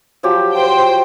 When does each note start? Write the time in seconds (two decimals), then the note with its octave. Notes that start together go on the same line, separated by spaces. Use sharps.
0.23 F3 F#3 G4
0.52 C5 G5